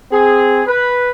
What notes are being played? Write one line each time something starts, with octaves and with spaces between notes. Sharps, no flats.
C4 G#4
B4